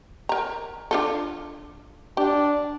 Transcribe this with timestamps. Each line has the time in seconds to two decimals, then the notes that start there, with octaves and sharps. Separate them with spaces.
0.29 A#4 A#5
0.91 D4 F4 A4
2.17 D4 G4